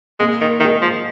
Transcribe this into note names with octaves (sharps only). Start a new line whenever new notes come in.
G#3 A#3
D#3
D#3 G#4 D#5
F3